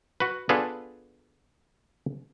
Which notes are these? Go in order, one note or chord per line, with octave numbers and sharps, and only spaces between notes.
F#4 B4
B3 D4 F4 G#4 A4 B4